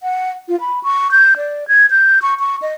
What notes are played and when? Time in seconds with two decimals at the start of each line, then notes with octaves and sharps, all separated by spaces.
0.03 F#5
0.49 F4
0.60 B5
0.83 C#6
1.11 G6
1.37 D5
1.68 G#6
1.91 G6
2.22 C#6
2.40 C#6
2.62 D#5